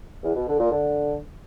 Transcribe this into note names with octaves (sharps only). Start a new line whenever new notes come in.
E2
B2
D3
A#2
D3